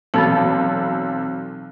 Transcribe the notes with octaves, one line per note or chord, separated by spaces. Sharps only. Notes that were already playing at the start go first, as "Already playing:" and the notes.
B1 E3 B3 C4 A4 A5